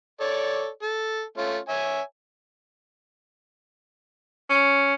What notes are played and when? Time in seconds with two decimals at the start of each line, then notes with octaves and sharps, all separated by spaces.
0.20 A4 C#5 D5
0.83 A4
1.37 A3 C#4 F4
1.69 C#5 E5 G#5
4.50 C#4